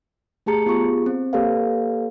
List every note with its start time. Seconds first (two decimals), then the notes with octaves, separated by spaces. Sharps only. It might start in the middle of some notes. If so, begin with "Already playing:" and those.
0.46 A3 G4 G#4 A5 A#5 C#7
0.66 B3 F4 G4 G#4 C#6
1.06 C4
1.33 A#3 G4 A4 B4 C#5 F5